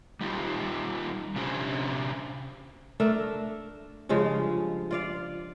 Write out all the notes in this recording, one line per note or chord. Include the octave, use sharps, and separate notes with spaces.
G3 D#4 F4 G4
C3 C#4 D4 G4 C5 G#5
A3 D4 A#4 E5
G2 C#3 F3 G#3
F4 D5 F5